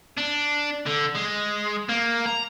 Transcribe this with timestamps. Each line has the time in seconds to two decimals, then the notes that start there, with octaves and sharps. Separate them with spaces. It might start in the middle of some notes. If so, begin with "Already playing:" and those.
0.17 D4
0.87 D3
1.15 G#3
1.89 A#3
2.26 A#5